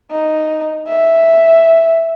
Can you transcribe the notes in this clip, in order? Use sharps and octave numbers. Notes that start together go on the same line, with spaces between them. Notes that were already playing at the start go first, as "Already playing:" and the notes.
D#4
E5